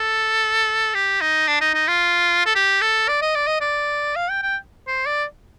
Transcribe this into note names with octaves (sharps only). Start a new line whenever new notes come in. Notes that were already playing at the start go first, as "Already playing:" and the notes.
Already playing: A4
G4
D#4
D4
D#4
D#4
F4
A4
G4
A4
D5
D#5
D5
D#5
D5
F5
G5
G5
C5
D5